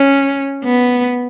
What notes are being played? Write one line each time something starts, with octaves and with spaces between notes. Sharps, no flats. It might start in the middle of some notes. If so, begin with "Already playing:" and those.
Already playing: C#4
B3